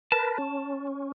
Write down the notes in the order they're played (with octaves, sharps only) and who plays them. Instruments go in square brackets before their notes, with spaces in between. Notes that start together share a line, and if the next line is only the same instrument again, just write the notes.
[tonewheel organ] A#4 B4 [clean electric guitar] A5
[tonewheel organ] C#4